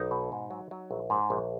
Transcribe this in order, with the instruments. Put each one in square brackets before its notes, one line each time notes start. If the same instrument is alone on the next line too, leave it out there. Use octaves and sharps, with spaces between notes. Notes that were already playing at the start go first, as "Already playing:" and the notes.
Already playing: [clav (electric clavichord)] B1 D#4
B2
G#2
F#3
F#3
A#1
G#2
A#1